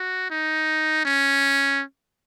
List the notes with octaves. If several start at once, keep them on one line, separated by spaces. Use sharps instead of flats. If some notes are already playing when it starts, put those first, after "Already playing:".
Already playing: F#4
D#4
C#4